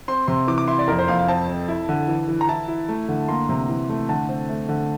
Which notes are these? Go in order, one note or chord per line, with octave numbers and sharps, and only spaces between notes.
C4 C6
C3 C6
E3 D6
D6
E4 C6
D5
F2 A#4
C5
F2 F5
F5
C4 A5
C4
E4
D3
E3
E3
A#5
E4 A5
E4
A3
D3
A#3 C6
C3
E3
A3
D3 A5
C4
A3
D3